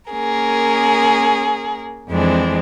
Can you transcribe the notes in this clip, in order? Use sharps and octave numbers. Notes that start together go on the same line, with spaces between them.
A#3 C#4 G#4 A#4
F2 E3 G#3 C4 D4